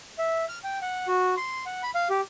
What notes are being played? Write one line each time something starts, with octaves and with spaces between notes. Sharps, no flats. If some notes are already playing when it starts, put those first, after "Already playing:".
E5
F6
G5
F#5
F#4
C6
F#5
B5
F5
G4